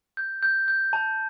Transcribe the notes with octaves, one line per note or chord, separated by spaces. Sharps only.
G6
G6
G6
A5